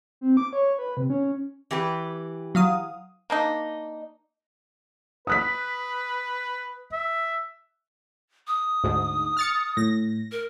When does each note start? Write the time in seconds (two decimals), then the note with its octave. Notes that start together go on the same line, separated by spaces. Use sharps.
0.21 C4
0.37 D6
0.53 C#5
0.78 B4
0.97 C3
1.10 C#4
1.71 E3 G4 B4
2.55 F#3 F5 D#6
3.30 A#3 D4 D#4
5.27 B4 D#6 F#6 B6
6.92 E5
8.47 D#6
8.84 D2 G#2
9.37 F6 A6 C#7
9.77 A2 A#6
10.32 A#4